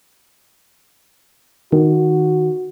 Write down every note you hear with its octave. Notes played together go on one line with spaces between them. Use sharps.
D#3 F#4